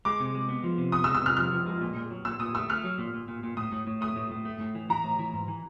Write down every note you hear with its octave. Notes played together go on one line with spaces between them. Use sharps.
G#3 D6
C3
G#3
B3
F3
C3
B3 D#6
E6
G#3
E6
C3 F6
F3 F6
F3
G#3
A#2
A#2
F#3
A#2 E6
A#2 D#6
A3 E6
A3 F6
F#3
A#2
A#2
A#2
A#2
A2 D#6
A2
A2
A3 D#6
A2
A2
A3
A2
E3
E3 A#5
A2
E3
G#2
E3